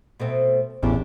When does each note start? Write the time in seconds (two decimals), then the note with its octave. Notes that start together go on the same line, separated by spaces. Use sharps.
0.20 B2 A3 C4
0.83 A1 E2 D4 G4